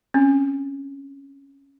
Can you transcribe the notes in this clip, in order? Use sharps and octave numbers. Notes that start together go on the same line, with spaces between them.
C4 C#4